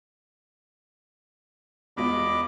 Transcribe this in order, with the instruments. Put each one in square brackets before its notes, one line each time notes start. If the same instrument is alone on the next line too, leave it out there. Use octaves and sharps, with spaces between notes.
[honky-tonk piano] E2 G#3 F4 [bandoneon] D#5 B5 D6